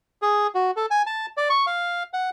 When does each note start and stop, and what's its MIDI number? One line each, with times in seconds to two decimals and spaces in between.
0.22 0.47 68
0.55 0.71 66
0.76 0.86 69
0.91 1.02 80
1.06 1.26 81
1.37 1.49 74
1.50 1.66 85
1.67 2.03 77
2.13 2.30 78